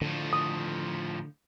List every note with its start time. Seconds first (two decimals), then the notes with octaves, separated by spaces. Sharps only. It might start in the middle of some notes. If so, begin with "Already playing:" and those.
0.01 A2 D3 F3 D4
0.33 D#6